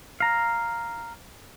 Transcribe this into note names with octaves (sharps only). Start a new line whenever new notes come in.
F5 A#5